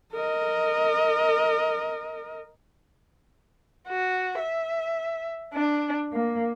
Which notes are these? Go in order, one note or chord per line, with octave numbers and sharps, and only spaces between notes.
A#4 D#5
F#4
E5
D4
A#3